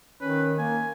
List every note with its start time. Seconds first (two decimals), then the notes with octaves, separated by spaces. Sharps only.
0.21 D#3 C#4 B4
0.59 A#3 G#5